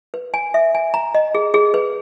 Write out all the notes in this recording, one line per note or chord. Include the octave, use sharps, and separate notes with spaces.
B4
G#5
E5
G#5
A#5
D#5
G#4
G#4
B4